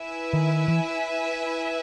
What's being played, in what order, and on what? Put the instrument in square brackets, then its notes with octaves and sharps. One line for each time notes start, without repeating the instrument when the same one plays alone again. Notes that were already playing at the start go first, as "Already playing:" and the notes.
Already playing: [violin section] E4 B4 E5 G#5
[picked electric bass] D#3
E3